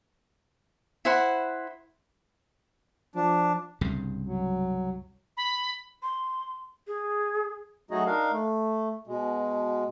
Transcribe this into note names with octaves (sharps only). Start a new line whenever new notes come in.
E4 C5 F#5 B5
F3 D4
C2 G2 C#3
F#3
B5
C6
G#4
F#3 A3 D#4 F#4 G#4 D#5
D4 D#4 A#4 F5
A3
B2 G#3